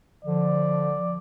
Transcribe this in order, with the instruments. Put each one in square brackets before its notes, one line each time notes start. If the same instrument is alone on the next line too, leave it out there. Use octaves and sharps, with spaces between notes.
[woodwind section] D3 F3 [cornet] D5